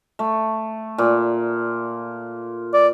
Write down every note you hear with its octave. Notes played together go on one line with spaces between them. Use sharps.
A3
A#2
D5